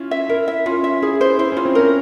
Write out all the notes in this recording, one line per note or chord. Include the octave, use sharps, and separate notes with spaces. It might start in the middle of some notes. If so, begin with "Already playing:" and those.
Already playing: C#4 E4 F4
E5
E4 A#4
E5
C#4 F4
E5
E4 G#4
C5
E4 C5
C#4 F4
C4
C#4 A#4